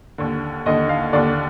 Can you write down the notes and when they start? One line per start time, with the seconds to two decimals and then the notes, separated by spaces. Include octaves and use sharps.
0.18 D#2 D3
0.66 D#2 D3 D#5
0.89 F5
1.13 D#2 D3 D5